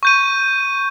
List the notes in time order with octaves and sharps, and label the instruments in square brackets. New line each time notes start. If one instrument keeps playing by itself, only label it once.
[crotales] C#6 G6 D#7